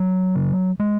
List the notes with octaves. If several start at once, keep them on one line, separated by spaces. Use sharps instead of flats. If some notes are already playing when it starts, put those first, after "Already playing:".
Already playing: F#3
C#3
G#3